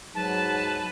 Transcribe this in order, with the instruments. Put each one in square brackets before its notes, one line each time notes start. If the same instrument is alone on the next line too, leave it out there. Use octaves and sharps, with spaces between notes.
[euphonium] G#2 [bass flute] F#3 [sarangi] B4 [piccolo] A5